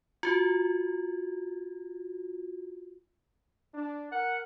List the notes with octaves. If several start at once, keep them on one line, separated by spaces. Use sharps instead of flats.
F4 F#4
D4
A#4 F#5